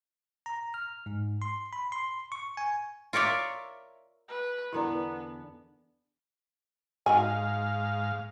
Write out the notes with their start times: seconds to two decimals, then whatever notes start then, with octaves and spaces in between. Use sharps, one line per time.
0.46 A#5
0.74 F6
1.06 G#2
1.42 C6
1.73 B5
1.92 C6
2.32 C#6
2.57 G#5
3.13 F4 A#4 C#5 D5 E5
4.29 B4
4.73 E2 D3 B3 E4 A#4 D5 A#5
7.06 G#2 D#4 F#4 F5 G#5